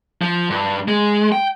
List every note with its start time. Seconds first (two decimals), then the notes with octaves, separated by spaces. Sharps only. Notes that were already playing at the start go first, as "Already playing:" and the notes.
0.22 F3
0.50 G2
0.88 G#3
1.32 G5